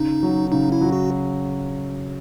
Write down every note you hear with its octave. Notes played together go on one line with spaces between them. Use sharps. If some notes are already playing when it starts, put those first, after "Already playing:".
Already playing: C#3 D#4
F#3
C#3 D#4
E4
F#3
F#4